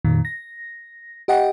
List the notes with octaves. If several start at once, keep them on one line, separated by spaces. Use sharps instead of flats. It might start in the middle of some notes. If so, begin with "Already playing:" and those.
F2 A#2 D#3
A#6
G4 D#5 F#5 G5